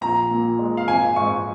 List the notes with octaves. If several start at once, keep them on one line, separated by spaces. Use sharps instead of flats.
A#1 A#5
A#2
G#3
F5
G#1 G#5
G#2 C#6